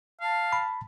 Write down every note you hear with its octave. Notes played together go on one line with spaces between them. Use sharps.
F5 A5
B5